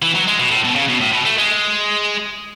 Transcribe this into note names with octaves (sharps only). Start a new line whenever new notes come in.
E3
F#3
G#3
B2
A2
B2
C#3
B2
A2
B2
A3
G#3